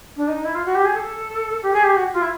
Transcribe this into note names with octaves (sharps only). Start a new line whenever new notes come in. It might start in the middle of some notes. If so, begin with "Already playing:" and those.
D4
D#4
E4
F4
F#4
G4
G#4
A4
G4
G#4
G4
F#4
F4
E4